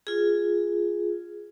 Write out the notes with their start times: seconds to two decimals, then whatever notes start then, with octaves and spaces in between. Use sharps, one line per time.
0.07 F4 G#4